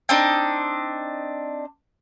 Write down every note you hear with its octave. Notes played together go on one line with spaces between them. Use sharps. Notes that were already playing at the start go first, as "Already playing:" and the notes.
C4 D4 D#4